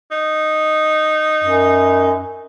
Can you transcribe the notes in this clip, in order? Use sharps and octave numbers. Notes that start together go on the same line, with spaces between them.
D#4
F#2